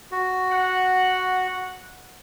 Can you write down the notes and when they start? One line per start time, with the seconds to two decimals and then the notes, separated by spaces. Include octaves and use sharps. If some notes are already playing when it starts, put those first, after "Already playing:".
0.12 F#4
0.50 F#5